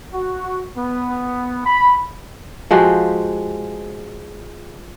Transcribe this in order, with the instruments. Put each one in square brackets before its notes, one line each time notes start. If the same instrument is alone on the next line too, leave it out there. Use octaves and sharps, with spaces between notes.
[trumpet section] F#4
B3
B5
[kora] F3 G#3 F#4 G4